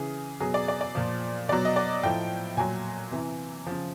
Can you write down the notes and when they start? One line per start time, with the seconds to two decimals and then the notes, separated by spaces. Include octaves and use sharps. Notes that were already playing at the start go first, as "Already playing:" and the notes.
Already playing: C#3 E3 G#4
0.40 B2 F#3 G#4
0.54 D5
0.68 D5
0.81 D5
0.95 A#2 F3
1.48 B2 F#3 D5
1.65 D#5
1.76 D5
2.03 A2 F3 G5
2.57 A#2 F#3 G#5
3.11 C3 E3
3.66 C#3 F3